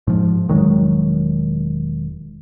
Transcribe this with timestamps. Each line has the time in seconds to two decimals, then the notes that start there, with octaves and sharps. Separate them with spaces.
0.07 G#2 F3
0.49 E1 D#3 F#3 G#3